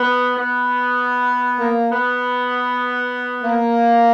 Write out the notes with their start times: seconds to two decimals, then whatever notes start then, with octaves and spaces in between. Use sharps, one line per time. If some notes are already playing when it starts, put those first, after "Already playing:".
Already playing: B3
0.36 B3
1.60 A#3
1.90 B3
3.44 A#3